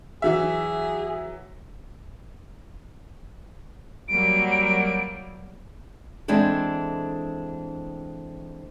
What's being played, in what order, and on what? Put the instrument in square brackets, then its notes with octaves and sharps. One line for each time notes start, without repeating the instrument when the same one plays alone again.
[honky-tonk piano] E3 F#3 E5 [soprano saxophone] G#4
[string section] F#3 G3 A#3 [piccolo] D7
[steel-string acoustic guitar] E3 G#3 C4 D4 A4